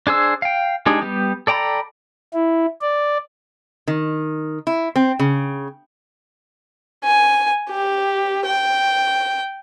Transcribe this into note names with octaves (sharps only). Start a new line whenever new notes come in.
D4 G#4 C5 E6
F5 G5
G#3 D4 D#4 G4 G#4
G3 B3 G4
A4 D5 G5 A#5 B5
E4
D5
D#3
E4
C4
C#3
G#5
G4
G5